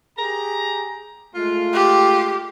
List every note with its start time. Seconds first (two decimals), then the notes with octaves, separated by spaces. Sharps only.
0.18 G4 G#4 A#5
1.35 G#3 A3 F4
1.74 G4